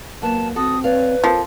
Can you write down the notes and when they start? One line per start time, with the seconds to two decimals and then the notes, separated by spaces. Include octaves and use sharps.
0.22 F#3 A#3 B3 A5
0.56 C4 F#4 A4 D#6
0.84 B4 C#5 D5 F5
1.24 F3 C4 A4 A#4